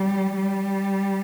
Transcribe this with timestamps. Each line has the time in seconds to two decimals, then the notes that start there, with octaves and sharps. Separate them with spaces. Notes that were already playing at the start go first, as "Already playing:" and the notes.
Already playing: G3
0.35 G3